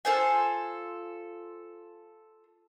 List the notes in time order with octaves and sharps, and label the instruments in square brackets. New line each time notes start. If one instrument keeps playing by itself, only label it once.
[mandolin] F4 A4 C5 G#5